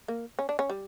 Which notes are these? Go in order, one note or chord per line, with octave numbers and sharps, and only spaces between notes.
A#3
C#4
D4
C#4
G3